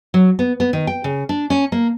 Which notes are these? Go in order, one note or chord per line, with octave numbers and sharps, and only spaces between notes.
F#3
B3
B3
D#3
G5
C#3
D4
C#4
A#3